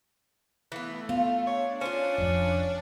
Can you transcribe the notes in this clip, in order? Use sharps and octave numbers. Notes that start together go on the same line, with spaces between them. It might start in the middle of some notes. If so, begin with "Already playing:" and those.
E3 A3 B3
B3 F4
D4 C#5
C#4 F4 C5
F1 F2